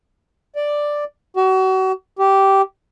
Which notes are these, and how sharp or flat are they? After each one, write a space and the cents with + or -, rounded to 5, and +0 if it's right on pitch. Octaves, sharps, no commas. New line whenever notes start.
D5 +5
F#4 +35
G4 -10